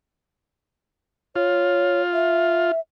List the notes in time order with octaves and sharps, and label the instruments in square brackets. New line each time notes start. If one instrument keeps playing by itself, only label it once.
[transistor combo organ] F4 [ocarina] C#5
[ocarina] E5